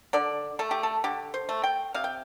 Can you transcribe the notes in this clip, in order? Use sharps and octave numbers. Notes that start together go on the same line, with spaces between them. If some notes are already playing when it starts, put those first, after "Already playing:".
D3 D5
A3 A4
G4
A4
D3 G4
C5
A3
G5
C3 F5
G5